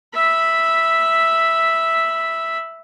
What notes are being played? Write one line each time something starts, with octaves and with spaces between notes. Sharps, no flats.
E5 B5